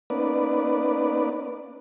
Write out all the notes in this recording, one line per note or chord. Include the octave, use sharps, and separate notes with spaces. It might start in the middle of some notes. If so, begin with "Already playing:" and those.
A#3 B3 C#4 D#4 B4 D5